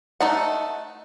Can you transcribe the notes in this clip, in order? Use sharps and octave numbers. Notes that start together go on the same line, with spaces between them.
A3 D#4 F#5